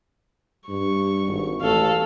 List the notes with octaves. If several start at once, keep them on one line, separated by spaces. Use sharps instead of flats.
G2 C#6
G#1
A1 A4 F5